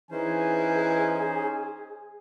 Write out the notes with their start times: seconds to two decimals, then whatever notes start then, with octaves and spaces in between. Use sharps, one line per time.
0.11 E3 C#4 D#4 G#4 C5 G#5